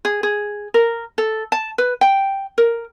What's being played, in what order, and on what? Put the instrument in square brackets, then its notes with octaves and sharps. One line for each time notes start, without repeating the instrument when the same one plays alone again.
[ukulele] G#4
G#4
A#4
A4
A5
B4
G5
A#4